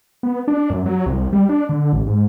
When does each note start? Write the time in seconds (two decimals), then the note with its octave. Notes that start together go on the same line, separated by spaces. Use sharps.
0.23 B3
0.48 D4
0.70 F#2
0.86 F#3
1.06 C2
1.33 G3
1.49 D4
1.69 D3
1.93 A1
2.07 G#2